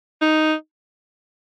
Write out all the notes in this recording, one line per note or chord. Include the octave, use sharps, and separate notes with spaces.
D#4